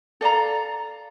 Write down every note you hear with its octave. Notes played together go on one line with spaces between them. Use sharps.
A4 D5 F5 A#5